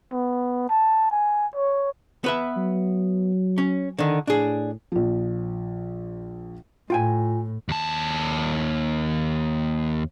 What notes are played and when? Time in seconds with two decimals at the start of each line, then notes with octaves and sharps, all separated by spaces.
0.12 B3
0.70 A5
1.11 G#5
1.55 C#5
2.24 B3 B4 E5
2.57 F#3
3.58 C#4
3.99 D3 D#3
4.27 A2 D4 G#4
4.92 A#1 F3
6.90 A2 F4 G5 G#5
7.69 D#2 A5